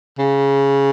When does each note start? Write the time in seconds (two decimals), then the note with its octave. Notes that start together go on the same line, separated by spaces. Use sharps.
0.18 C#3